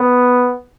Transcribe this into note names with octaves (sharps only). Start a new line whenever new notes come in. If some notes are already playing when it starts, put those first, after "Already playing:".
Already playing: B3